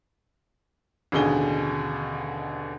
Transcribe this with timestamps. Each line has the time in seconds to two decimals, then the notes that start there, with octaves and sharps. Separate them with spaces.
1.12 A1 D#2 B2 D3 G#4 G7